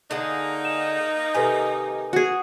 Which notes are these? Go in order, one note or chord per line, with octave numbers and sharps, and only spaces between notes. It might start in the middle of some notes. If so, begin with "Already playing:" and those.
D3 A#3 D#4 G#4 F#5
E7
C3 D#3 A4 B4 G#5
F#4 G#4